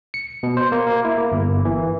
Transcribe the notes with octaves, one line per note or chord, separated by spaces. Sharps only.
C#7
B2
C5
A#3
A#3
E4
A#3
G1
E3